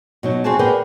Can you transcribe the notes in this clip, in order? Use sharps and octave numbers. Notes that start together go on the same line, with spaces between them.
B2 F#3 D#4
E2 C4 F#4 G#4 C#5 A5
G#4 A#4 B4 D5 F#5 G5